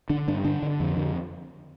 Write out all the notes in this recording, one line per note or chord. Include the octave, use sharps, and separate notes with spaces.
D3 D4
G2 D4
D3 D4
D3
F2
D3